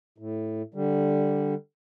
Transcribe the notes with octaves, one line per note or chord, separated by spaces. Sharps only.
A2
D3 G3